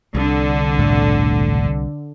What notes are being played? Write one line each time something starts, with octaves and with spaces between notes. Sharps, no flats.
C2 D3
E1 A2 A3